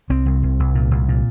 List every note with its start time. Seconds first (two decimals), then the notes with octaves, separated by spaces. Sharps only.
0.10 C2 C4
0.26 C2
0.43 C2
0.60 C2
0.75 A#2
0.91 C2
1.09 A#2